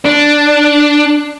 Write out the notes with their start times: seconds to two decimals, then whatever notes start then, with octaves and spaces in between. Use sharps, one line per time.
0.05 D4